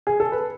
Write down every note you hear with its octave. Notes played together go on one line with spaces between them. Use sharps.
G#4
A4
B4